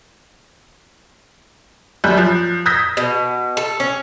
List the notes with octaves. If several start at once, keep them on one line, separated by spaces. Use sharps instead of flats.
F#2 G3 F#6 G6
F3
D#6 E6 G6 G#6 A#6 B6
B2
A4
C#4